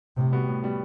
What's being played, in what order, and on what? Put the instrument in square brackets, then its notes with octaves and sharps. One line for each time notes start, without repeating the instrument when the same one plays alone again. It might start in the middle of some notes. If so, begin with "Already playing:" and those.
[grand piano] A2 [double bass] C3
[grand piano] G3 B3 F#4
A2
G3 B3 F#4